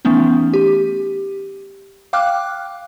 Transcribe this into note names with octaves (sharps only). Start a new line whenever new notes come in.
E3 A3 B3 C#4 D#4
G4
F5 G5 D6 F6 F#6